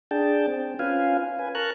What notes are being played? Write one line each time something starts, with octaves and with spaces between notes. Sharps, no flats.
D4 G#4 G5 A5
C4
C#4 F4 B4 F5 G#5
B4 G#5
A#4 A5 A#5 C#6 F#6